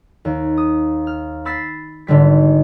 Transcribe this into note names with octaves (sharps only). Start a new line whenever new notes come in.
D#2
D#6
F6
B5 E6 A6 B6 C7
G#1 D3 G3 B6